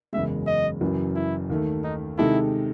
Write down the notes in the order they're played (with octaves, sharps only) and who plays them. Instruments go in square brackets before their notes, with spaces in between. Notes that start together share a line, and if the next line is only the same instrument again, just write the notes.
[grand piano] F#1 E2 C#3 G#3 [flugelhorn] E5
[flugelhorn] D#5
[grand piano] F#1 F#2 E3
[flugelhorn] E4
[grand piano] D#2 D#3 A3
[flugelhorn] D#4
[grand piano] C3 D#3 G#3 D#4 A4 [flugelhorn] E4